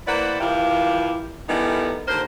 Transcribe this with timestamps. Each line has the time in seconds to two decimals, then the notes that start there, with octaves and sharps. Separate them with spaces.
0.07 A#3 E4 B4 C5 D5 F#5
0.39 E3 F3 A#3 E4 F4 G4
1.48 D#3 E3 G3 A3 B3 D#4
2.07 D#2 D3 A#4 C5